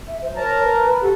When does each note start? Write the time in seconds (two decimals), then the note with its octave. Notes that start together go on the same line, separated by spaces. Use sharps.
0.08 E5
0.22 F#2 C5
0.37 A#4 C#5 A5 A#5
0.64 B4
0.87 B4
1.02 F#4 G4 A4